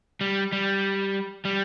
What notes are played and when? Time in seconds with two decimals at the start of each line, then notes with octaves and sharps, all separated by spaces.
0.21 G3
0.53 G3
1.45 G3